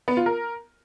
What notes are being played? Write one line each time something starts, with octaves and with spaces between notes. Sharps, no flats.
B3
F4
A#4